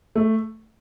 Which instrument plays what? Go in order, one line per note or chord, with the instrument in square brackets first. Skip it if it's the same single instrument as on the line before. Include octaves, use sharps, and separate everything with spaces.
[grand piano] A3